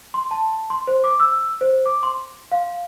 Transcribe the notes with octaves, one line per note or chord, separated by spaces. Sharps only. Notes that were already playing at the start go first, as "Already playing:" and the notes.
C6
A5
C6
C5
D6
E6
C5
D6
C6
F5